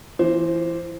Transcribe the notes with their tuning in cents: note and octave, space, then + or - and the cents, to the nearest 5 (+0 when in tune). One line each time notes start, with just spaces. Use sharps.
E3 +20 C5 +0